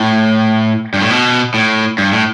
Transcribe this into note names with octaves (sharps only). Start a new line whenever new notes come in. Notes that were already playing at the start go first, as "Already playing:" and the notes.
Already playing: A2
G2
A2
B2
A2
G2
A2